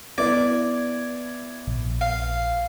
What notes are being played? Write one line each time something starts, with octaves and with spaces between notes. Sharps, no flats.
B3 E4 D5 G#6
A#1
F5